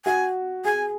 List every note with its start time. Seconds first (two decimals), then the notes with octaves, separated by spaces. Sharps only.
0.05 F#4 G#5
0.65 G#4 G#5